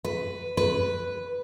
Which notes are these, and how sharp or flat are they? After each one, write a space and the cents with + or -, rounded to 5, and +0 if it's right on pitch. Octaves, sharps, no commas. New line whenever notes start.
B4 +5
B4 +0